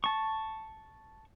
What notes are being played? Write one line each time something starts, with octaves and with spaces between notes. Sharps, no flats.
A5 C#6